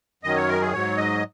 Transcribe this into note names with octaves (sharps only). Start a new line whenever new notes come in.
F#2 D#3 F#3 D#5
C#5
A#4
G#4
G#2 F#3 C#5
D#5